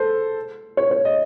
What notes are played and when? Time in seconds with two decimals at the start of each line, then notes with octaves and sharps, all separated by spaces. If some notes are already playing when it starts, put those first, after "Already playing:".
Already playing: A4 C5
0.77 C#5
0.91 C#5
1.05 D#5